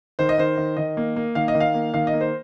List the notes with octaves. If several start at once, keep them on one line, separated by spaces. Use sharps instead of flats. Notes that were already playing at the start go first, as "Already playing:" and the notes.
D#3 C5
D#5
D#3 C5
D#3
D#3 D#5
A#3
A#3
D#3 F5
D#5
D#3
F5
A#3
D#3 F5
D#5
A#3
C5